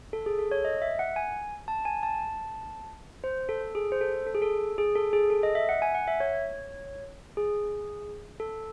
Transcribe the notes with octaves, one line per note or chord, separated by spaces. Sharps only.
A4
G#4
A4
C#5
D#5
E5
F#5
G#5
A5
G#5
A5
C5
A4
G#4
C5
A4
A4
G#4
A4
G#4
A4
G#4
A4
D#5
E5
F#5
G#5
F#5
E5
C#5
G#4
A4